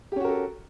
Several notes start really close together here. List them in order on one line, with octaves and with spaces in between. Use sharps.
G4 C#4 F#4 A#4 A4